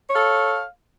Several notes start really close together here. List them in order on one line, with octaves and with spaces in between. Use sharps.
C#5 F5 A4